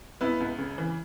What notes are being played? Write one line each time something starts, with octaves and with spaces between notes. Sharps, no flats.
C#2 B3 E4
C#2
C#3
E3